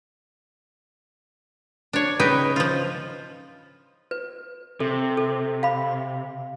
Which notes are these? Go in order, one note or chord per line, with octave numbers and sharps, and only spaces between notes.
D4 C#5
C#3 D#4 B4 G5
F3 F4
B4
C3 A4
A4
F5 B5